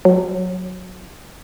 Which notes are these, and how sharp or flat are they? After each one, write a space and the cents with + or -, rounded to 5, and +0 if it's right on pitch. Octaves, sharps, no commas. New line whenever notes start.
F#3 -10